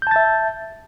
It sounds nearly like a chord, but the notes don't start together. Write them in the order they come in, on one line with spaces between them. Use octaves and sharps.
G6 A5 A6 E5